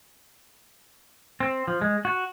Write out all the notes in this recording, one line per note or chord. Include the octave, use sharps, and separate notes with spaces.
C4
F3
G#3
F#4